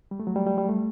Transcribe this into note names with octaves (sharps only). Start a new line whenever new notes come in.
G3
A3
F#3
G3
G3
G3
A3